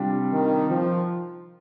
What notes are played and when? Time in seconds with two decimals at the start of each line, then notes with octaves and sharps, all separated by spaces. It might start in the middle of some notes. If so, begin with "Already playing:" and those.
Already playing: C3 G3 D4 F4
0.31 D#3
0.68 F3